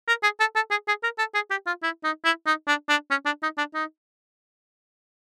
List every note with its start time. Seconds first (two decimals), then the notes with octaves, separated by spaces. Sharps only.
0.08 A#4
0.23 G#4
0.40 A4
0.56 A4
0.71 G#4
0.88 G#4
1.03 A#4
1.19 A4
1.35 G#4
1.51 G4
1.67 F4
1.83 E4
2.04 D#4
2.25 E4
2.47 D#4
2.68 D4
2.89 D4
3.11 C#4
3.26 D4
3.43 D#4
3.58 D4
3.74 D#4